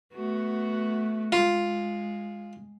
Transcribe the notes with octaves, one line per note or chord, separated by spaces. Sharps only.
A3 B3 F#4
G#3 F4